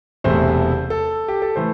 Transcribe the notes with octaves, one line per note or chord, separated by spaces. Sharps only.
E1 E2 C3 A3 C5
A4
G4
A4
E3 A3 C5